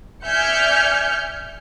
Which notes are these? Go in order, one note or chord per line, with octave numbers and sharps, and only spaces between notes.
D5 E5 G#5 F6 G6 C#7